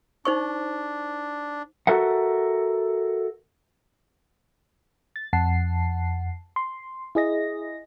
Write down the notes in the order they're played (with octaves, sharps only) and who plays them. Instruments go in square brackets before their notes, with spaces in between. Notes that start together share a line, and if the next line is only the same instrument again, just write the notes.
[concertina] D4 [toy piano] D#4 C5 C#6
[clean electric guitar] F#4 A4 A#4 E5 F#5
[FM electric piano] A6
F2 F#5 A5 C7
C6
E4 G#4 D#5 A#6